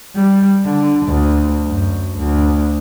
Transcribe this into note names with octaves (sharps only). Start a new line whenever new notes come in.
G3
D3
D2
F#2
D2